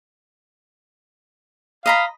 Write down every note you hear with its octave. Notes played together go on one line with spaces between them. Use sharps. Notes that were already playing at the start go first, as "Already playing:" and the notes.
D#5 F5 A#5 B5